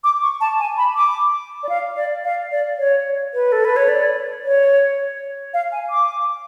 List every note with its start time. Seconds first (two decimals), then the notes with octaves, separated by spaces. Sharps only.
0.04 D6
0.22 C#6
0.41 A5
0.59 G#5
0.77 B5
0.96 D6
1.63 D5
1.69 F5
1.96 D5
2.24 F5
2.51 D5
2.79 C#5
3.34 B4
3.52 A4
3.65 B4
3.76 C#5
3.89 D5
4.43 C#5
5.54 F5
5.72 G#5
5.90 D6